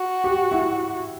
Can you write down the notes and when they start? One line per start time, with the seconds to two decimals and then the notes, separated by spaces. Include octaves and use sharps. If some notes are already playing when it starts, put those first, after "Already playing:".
Already playing: F#4
0.24 G4
0.51 E4